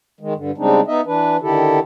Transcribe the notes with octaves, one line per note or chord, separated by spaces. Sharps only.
D#3 G#3
G2 D3
C#3 G3 G#3 C4 D4 D#4
B3 D#4 D#5 E5
E3 D4 B4
D3 D#3 E4 G4 A4